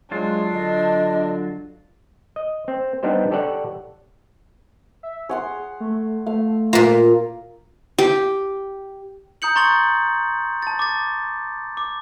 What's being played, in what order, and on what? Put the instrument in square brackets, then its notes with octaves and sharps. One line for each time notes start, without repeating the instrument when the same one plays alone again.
[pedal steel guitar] F#3 F4 [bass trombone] G#3 [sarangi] D4
[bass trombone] D3 [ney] D#5
[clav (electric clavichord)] D#5
C4
G3 B3 D4 D#4 G4 C5
G4 A4 C#5 D5 F#5
[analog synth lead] E5
[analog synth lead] G#4 [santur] C#5 F#5 C6
[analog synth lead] A3
[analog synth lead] A3 [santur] F5
[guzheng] A#2 A#3 [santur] F4 F5
[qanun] G4
[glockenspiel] A#5 D#6 G6 C#7 F#7
A#5 C6 C#6 A6 C#7 F#7
A5 A6
D6 A6
D6